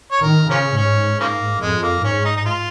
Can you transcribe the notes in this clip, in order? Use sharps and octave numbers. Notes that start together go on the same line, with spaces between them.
C#5
D#3 A#4
C#3 F3 A#3 C#4
G#2 C#4
C#3 F3 A#3
F2 G#3
A#3
G#2 C#4
D#4
D#4
F4